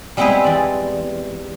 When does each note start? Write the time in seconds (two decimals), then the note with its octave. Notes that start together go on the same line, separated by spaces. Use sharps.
0.17 G3 G#3 B3 C4 E4 B4
0.44 E2 D5